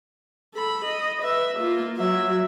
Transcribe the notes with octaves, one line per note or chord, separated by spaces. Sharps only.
A4 B5
D#5
B4 E5
A#3 F4
F#3 E5